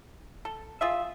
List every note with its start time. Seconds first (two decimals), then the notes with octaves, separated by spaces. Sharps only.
0.45 A4
0.81 F4 G#4 E5